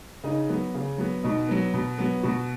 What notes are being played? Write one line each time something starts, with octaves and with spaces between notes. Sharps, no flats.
C#3 D#4
F#3 B3
C#3
F#3 B3
B2 D#4
F#3 B3
B2
F#3 B3
B2 F#4